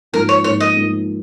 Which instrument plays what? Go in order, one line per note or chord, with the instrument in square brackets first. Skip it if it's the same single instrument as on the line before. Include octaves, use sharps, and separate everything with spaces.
[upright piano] G#2 F3 A#3 [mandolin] A#4
[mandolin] C#5
[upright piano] G#2 F3 A#3 [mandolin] C#5
[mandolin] D#5
[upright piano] G#2 F3 A#3